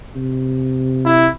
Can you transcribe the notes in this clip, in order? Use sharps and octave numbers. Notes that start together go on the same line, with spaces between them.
C3
E4